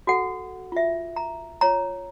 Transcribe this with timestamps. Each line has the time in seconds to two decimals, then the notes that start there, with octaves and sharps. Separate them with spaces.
0.07 F#4 A4 F#5
0.72 F4 E5
1.16 A#5
1.61 F4 C#5 A#5